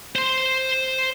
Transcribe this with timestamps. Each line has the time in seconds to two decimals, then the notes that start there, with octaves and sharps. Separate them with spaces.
0.15 C5 C6